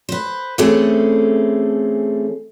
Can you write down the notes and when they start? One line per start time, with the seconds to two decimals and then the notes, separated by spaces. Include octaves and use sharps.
0.09 B4 C5
0.58 E3 A3 C4 C#4 G#4 A4